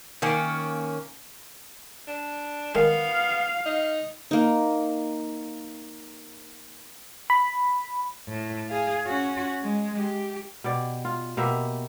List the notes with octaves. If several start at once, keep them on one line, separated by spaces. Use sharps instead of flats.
D#3 A#3 C#4
D4
D#3 G#3 B3 F5
D#4
A#3 D#4
B5
A2
G#4 F5
C#4 F#4
G#3
G4
B2 G4 D5
F4
B2 A#3 G4 E5